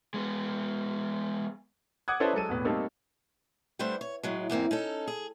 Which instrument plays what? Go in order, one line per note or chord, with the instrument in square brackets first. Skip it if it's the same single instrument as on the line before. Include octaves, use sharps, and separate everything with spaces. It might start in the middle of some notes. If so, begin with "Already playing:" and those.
[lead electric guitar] G#3 B3
[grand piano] F#5 D6 D#6 F#6 G#6
C#4 E4 A4 B4 C5 D5
F#3 G#3 A4 D#7
E1 A2 B3
G3 A3 A#3 C4 D#4 A4
[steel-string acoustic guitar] G3 A3 B3 D4 C5
C#5
A2 F#3 G#3
E2 G#2 A#3 C4
C#4 D#4 A4
G#4